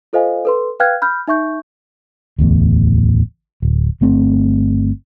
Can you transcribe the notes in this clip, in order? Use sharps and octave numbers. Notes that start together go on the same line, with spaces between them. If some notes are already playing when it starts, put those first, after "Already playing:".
F4 A4 C5 D#5 F5 G#5
A4 B4 C6
B4 F5 G5 F6 F#6 G#6
B5 F6 G6
D#4 E5 C#6 G6
D1 A1 E2 A2
D1
G1 A3 C4